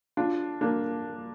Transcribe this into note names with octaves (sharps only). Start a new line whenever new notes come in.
D4 F4
A#3 D4